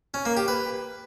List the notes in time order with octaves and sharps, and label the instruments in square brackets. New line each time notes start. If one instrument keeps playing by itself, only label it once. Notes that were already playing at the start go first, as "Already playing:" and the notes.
[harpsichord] C#4
A#3
G4
B4